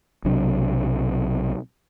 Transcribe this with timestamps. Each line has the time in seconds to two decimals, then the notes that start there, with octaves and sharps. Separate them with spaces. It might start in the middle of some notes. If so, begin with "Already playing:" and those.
0.24 B1 C3 F#3 D4